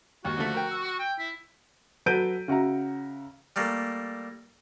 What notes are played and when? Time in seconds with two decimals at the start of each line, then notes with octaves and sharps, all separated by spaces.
0.25 D#2 F#4
0.37 D3 F3 A3
0.54 A#4 G5
0.71 E6
0.99 G5
1.19 E4
2.06 F#3 A4 B4 G6 D7 D#7
2.48 C#3 F#4 E5 A#5
3.56 G3 A3 A#3